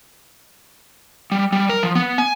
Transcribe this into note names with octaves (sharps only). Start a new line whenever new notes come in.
G3
G3
A#4
F3
B3
G#5